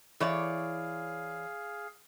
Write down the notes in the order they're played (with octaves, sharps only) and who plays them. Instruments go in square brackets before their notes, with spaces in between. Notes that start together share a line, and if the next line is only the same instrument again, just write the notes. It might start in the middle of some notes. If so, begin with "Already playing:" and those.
[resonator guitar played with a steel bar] E3 C#5 D5 [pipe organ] G#4 F5